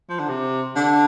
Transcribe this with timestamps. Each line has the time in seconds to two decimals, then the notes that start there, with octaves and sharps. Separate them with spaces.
0.10 F3
0.20 D3
0.29 C3
0.76 D3